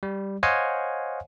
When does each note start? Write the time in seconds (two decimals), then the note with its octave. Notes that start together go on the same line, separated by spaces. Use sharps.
0.03 G3
0.43 C5 C#5 D#5 F5 F#5 G#5